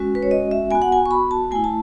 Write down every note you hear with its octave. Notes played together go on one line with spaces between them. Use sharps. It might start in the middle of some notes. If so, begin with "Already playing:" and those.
Already playing: G#3 C#4 F#4
B4
C#5
D#5
E5
B3 F#4 G#5
F#5
G#5
C#6
B5
A5
A3 E4 G#5
A5